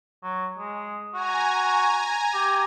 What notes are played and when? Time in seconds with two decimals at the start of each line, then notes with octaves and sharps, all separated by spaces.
0.23 F#3
0.58 G#3
1.14 F#4 G#5 A#5
2.34 G4